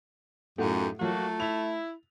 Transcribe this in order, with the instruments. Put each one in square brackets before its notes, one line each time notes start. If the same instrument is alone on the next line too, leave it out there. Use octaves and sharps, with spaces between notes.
[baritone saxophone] F#2 [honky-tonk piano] A2 A3 F#5 [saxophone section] D#4 F4 G4
[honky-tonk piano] F3 F#3 [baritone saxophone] A3 [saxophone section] A#3 F#4 A#4
[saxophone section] E4 [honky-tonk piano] F7